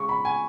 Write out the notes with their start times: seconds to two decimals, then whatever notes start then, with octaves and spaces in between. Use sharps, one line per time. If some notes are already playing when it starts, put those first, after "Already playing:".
Already playing: C#3 G#3 C#6
0.09 B5
0.25 G#5